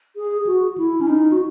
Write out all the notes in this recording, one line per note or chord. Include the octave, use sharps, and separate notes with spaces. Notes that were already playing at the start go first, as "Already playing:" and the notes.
G#4
F#4
E4
C#4
D#4
F#4